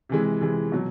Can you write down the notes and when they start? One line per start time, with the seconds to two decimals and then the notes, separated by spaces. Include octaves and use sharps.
0.09 C3 E3 G#3
0.41 C3 E3 G#3
0.72 B2 F#3